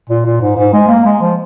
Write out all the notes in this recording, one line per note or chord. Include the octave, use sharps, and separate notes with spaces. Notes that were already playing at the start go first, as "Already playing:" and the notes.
A#2
A#2
G#2
G#2
G#3
A#3
G#3
F3